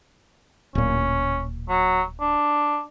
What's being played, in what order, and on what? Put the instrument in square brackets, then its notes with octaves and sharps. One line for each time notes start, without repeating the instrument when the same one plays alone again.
[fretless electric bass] D1 A#2 [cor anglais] C#4
[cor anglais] F#3
D4